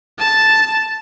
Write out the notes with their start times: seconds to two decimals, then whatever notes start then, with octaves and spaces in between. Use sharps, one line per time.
0.19 A5